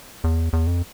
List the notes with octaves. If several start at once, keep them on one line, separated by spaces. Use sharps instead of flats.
E2
E2
F2